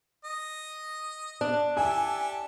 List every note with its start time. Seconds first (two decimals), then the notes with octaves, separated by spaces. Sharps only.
0.25 D#5
1.41 D4
1.77 G4 A4 E5 G#5